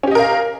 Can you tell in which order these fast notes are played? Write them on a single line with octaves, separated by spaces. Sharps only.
C#4 G4 D#5 A#4 F5